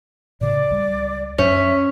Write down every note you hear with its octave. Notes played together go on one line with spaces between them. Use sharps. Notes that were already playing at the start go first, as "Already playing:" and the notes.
A2 C#3 D5
C#2 G3
F#2 C#4 E5